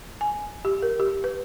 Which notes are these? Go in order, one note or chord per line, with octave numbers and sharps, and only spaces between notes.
G#5
G4
A#4
G4
B4